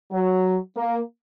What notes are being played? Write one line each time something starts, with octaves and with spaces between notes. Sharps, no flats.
F#3
A#3